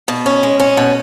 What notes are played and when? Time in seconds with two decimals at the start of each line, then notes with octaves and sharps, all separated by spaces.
0.08 B2
0.26 C#4
0.43 G#3
0.60 C#4
0.77 B2